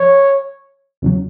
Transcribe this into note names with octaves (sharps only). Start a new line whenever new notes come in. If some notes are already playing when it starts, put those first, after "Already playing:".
Already playing: F3 C#5
E2 C#3 F#3